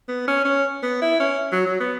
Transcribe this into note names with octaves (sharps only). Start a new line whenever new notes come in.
B3
C#4
C#4
B3
E4
C#4
F#3
F#3
B3